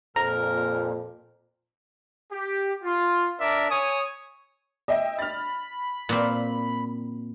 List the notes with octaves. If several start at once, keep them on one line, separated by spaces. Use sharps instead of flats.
F2 A#2 A#4 A#5
G4
F4
D4 A#4 D5 E5
C#5 G#5 D#6
D#5 E5 G5
B5 F6 A6
A#2 C4